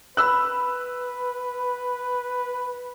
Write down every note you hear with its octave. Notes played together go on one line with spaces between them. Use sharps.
B4 B5 E6 F#6